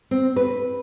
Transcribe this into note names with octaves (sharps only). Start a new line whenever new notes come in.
C4
B4